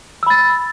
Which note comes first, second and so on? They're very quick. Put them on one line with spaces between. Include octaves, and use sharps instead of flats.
E6 B5 A6